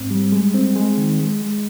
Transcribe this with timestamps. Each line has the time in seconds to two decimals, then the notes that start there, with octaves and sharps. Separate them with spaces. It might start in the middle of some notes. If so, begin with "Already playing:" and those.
Already playing: G#2 C4
0.10 G3
0.32 G#3
0.54 C4
0.75 G#3
0.98 D#3
1.19 G#3
1.41 G#3